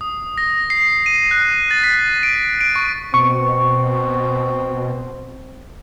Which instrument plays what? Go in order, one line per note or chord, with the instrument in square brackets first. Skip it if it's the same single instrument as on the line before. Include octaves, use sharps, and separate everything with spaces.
[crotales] D#6
A#6
C7
D#7
F#6
A6
B6
D7
D7
C#6
[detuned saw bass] B2 [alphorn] C4 [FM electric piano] C#6